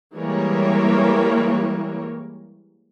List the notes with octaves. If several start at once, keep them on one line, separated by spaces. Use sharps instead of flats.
E3 G3 G#3 A#3 A#4 C#5